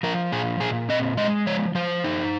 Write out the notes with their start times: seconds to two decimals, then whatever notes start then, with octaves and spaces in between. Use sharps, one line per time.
0.03 F3 A#4
0.32 A#2 G#4
0.60 A#2 G#4
0.89 C4 D#5
1.17 G#3 D#5
1.46 F3 C#5
1.75 F3 C5
2.04 D#4